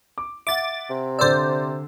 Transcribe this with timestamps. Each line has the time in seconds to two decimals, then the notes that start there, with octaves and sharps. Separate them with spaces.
0.18 D6
0.47 E5 F#5 D6 A6
0.90 C3
1.19 D3 C5 D5 E6